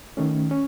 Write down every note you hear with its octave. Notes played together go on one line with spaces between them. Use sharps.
D#3 A3 C#4
C#4